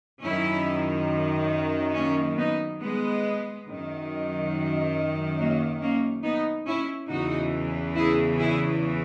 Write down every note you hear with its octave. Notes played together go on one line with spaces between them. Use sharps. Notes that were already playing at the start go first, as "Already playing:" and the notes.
F#2 D#3 C#4 E4
A#3 C#4
B3 D#4
G#3 B3
F#2 D#3
F#3 A#3
A#3 C#4
B3 D#4
C#4 E4
E2 C#3 E3 D#4 F#4
E4 G#4
E4 G#4